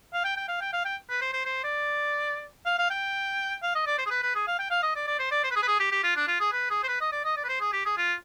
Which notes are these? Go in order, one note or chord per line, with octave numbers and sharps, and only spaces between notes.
F5
G5
G5
F5
G5
F5
G5
B4
C5
C5
C5
D5
F5
F5
G5
F5
D#5
D5
C5
G#4
B4
B4
G#4
F5
G5
F5
D#5
D5
D5
C5
D5
C5
B4
G#4
B4
G#4
G4
G4
F4
D4
F4
G#4
B4
G#4
C5
B4
D#5
D5
D#5
D5
B4
C5
G#4
G4
G#4
F4